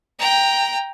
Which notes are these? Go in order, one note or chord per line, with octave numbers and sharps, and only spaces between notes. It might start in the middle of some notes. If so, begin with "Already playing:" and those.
G5 A#5